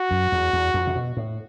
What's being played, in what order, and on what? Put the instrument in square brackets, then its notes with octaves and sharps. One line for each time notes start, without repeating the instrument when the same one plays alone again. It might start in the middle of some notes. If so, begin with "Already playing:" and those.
Already playing: [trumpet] F#4
[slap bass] F#2
E2
E2
F2
C3
B2
A2